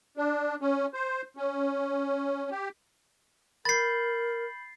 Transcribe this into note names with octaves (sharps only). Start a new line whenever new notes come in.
D4
C#4
C5
C#4
G4
A#4 B5 G6 A6 C7